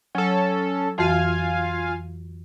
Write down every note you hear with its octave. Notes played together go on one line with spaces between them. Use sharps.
F#3 C#4 A4
F2 E3 F4 F#4 F5 G#5